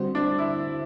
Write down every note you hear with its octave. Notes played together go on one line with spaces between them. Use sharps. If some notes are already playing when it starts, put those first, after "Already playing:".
Already playing: D3 G3 C4 F#4 C5
D4
E4